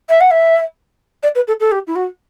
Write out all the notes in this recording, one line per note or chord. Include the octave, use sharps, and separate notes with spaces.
E5
F#5
E5
D5
B4
A4
A4
G4
E4
F#4